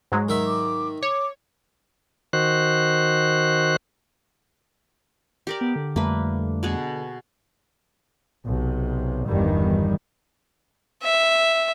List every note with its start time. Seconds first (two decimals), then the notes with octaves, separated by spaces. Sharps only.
0.12 G#2 F#3 G#3
0.29 D#3 E5
0.46 D6
1.03 C#5 D6
2.33 D#3 F#4 C5 F#6
5.47 G4 A#4 D5
5.61 B3
5.76 D3
5.96 F2 G3 A3 A#3 B4
6.63 B2 G#4 F#5
8.45 B1 C3
9.27 G1 E2 G2 D#3 G3
11.03 E5